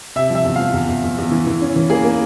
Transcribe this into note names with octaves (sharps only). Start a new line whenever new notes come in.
C3 E5
F3 E5
E2
F3 F5
E2
E2
E2
E2
E3
E3
C#4
E3
A#3 G#4
A#3